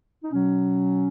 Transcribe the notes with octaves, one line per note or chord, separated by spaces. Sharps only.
D#4
B2 F#3 C#4